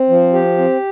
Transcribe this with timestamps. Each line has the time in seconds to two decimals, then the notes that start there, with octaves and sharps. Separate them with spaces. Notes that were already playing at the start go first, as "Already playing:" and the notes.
Already playing: C4
0.09 F3
0.33 G4
0.58 C4